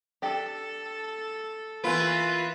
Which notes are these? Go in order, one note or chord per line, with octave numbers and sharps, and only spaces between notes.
D4 G4 A4
E3 A#3 B3 F4 B4